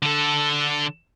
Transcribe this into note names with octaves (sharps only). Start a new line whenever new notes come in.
D3 A4